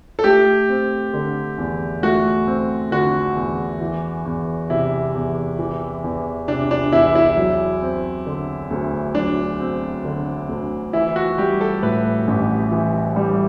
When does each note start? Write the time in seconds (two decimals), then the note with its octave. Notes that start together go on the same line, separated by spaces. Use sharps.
0.19 A4
0.24 A3 G4
0.69 C4
1.13 D3
1.58 E2
2.03 A3 F#4
2.47 C4
2.91 D3 F#4
3.36 E2
3.81 E3
4.25 E2
4.70 C3 E4
5.15 E2
5.59 E3
6.04 E2
6.48 C3 D4
6.71 D4
6.92 E2 E4
7.15 E4
7.37 F#3
7.82 C4
8.26 D3
8.71 D2
9.15 F#3 D4
9.60 C4
10.05 D3
10.49 D2
10.93 E3 E4
11.16 F#4
11.38 G3 G4
11.61 A4
11.83 A2 B4
12.27 A1
12.72 E3
13.16 G3